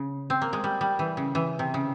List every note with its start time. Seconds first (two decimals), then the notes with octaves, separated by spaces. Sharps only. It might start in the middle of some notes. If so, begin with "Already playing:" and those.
Already playing: C#3
0.30 C4
0.42 A#3
0.53 G#3
0.64 G3
0.81 G3
0.99 E3
1.17 C#3
1.35 E3
1.59 C3
1.74 C#3